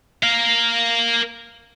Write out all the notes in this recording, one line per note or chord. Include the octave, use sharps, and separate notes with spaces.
A#4 F5